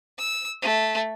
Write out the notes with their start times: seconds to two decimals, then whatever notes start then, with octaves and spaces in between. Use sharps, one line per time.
0.19 E6
0.62 A3